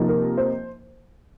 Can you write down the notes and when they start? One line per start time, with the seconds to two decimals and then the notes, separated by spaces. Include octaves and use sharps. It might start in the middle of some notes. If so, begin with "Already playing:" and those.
Already playing: C3 F3 A#3 D#4
0.08 A#4
0.38 C5